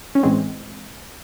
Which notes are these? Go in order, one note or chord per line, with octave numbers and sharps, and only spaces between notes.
C#4
A2 E3 G#3 C4